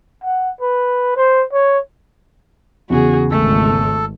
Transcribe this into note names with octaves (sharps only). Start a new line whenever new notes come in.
F#5
B4
C5
C#5
E2 C#3 F#4 G#4
G#1 A3 A4